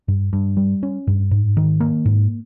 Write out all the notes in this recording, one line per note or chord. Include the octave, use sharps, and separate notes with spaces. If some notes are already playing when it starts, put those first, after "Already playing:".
G2
G2
G3
C#4
G2
G#2
D#3
A#3
G#2